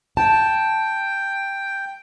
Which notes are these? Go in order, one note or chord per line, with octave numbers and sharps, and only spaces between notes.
G5 A5